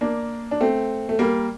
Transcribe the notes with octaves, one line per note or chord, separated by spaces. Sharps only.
A#3 D4
D4
A3 C4
A3
G3 A#3